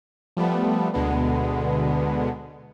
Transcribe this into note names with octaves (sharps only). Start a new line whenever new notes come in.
F3 G3 A3 B3
D2 B2 D3 G#3 B3